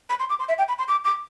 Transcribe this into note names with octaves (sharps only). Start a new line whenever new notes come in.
B5
C6
D6
C6
E5
G5
B5
C6
D6
D6